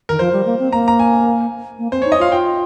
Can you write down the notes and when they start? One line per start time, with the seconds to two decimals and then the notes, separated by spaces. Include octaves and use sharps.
0.09 D#3 A#4
0.19 F3 C5
0.33 G3
0.46 A#3
0.59 C4
0.72 A#3 A#5
0.88 A#5
0.99 G#5
1.79 A#3
1.92 C4 C5
2.02 D#4 C#5
2.12 D#5
2.19 F4 F5
2.32 F4 G5